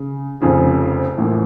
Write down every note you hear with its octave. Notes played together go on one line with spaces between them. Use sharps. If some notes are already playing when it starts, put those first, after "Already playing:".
Already playing: C#3
F1 F2 C#3 F3
A1 A2 F3 A#3